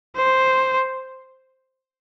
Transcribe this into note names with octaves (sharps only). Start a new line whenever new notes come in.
C5